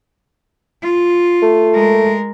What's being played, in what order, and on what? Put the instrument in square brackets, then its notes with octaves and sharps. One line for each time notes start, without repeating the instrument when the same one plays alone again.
[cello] F4
[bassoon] A3
[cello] G#3 A#4